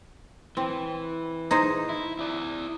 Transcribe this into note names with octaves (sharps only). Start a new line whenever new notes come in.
E3 C4
D#4 G#4 C5
E4
E4 D5